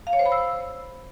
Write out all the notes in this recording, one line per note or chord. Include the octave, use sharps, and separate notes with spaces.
F5
C#5
C5
B5
E6